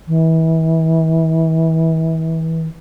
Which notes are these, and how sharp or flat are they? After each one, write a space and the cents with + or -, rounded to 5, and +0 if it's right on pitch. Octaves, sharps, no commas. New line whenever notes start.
E3 -30